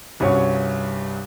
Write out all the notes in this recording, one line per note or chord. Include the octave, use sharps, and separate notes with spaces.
C2 G2 C#4 F#4 C#5